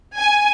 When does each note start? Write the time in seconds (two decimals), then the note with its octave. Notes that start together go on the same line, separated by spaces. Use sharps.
0.17 G#5